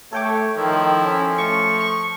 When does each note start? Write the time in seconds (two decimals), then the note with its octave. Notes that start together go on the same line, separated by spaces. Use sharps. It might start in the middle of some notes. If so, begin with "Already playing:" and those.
0.13 A3 A4 C#5 G5 D6
0.57 D#3 F3 E4
1.05 C#4
1.38 A3 C#6
1.79 C#6